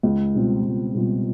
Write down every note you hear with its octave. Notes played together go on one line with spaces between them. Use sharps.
C#2
B2 G3 C4 F4
C#2
B2 G3 C4 F4